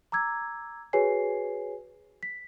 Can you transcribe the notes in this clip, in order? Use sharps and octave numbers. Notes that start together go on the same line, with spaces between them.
A#5 D6 E6 G#6
F#4 G#4 B4 C#5 G#5 C7
B6